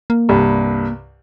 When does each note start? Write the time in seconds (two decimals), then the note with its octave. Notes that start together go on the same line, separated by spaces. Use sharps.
0.10 A#3
0.29 C2 G2